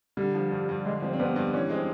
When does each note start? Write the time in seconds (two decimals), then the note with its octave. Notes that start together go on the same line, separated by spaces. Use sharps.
0.17 D3 G3
0.34 F3
0.51 G2
0.69 G2
0.85 D3 G#3
1.02 F3 C4
1.13 C4
1.19 G2 B3
1.36 G2
1.53 E3 C#4
1.70 G#3 C4